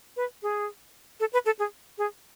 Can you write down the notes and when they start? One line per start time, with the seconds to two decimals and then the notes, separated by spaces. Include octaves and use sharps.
0.17 B4
0.43 G#4
1.20 A4
1.33 B4
1.46 A4
1.59 G#4
1.98 G#4